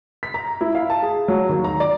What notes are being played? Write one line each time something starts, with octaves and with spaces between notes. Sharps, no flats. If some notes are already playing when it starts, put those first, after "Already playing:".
B6
A#5
E4
F5
A5
G#4
F#3
D#2
A#5
D5